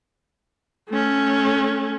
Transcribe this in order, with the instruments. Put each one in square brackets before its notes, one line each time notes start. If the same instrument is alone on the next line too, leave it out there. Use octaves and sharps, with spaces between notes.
[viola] A3 C#4